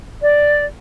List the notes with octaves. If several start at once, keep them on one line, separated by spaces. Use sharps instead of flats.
D5